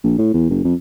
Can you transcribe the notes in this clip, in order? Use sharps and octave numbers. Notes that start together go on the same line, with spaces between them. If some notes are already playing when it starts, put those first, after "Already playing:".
A#1
A2
E2
F#1
F2